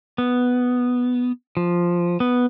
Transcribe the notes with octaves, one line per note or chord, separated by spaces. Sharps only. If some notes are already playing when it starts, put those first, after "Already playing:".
B3
F3
B3